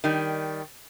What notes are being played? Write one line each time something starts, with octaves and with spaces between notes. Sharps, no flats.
D#3 G3